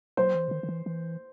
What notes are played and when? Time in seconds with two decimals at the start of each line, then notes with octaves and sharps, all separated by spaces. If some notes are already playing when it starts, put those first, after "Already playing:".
0.17 F#3 C5
0.34 E3
0.48 C3
0.51 D#3
0.63 D#3
0.69 E3
0.86 E3